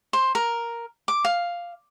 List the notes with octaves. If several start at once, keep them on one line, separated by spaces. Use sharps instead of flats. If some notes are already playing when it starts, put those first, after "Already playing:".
C5
A#4
D6
F5